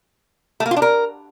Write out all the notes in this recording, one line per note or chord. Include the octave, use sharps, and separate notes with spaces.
A3
A#3
F4
D4
A#4